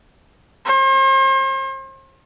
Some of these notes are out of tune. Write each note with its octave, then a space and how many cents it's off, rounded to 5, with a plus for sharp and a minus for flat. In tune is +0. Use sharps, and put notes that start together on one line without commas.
C5 +40